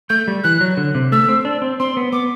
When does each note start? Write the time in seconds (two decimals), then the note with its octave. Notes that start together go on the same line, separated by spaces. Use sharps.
0.09 A3 G6
0.28 G3
0.44 E3 F#6
0.61 F#3
0.77 D3
0.95 C3
1.12 A3 E6
1.28 C4
1.45 D4
1.62 C4
1.80 C4 C6
1.97 B3
2.12 B3 D6